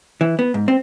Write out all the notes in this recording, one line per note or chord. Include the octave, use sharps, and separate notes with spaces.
E3
B3
G#2
C4